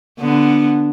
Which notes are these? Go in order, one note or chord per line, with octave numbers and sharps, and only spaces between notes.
D3 B3